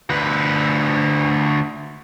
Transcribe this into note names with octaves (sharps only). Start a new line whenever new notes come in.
D2 B4